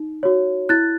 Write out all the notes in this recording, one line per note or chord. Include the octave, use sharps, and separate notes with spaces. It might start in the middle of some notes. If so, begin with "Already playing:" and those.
Already playing: D#4
F#4 C#5
E4 F#6 A6